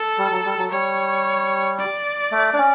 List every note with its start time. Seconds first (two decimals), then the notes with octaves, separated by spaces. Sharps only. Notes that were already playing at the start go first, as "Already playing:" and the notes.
Already playing: A4
0.18 G3
0.31 F#3
0.45 G3
0.58 F#3
0.71 G3 C#5
1.79 D5
2.31 A3
2.53 D4
2.58 C#4